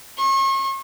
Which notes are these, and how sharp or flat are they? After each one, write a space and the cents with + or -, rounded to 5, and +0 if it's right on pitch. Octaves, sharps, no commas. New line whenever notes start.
C#6 -40